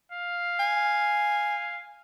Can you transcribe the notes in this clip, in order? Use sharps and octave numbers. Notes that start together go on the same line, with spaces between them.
F5
G#5